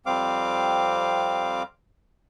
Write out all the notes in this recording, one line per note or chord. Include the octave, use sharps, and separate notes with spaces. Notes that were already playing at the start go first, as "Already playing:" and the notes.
F2 G3 C4 F5 D6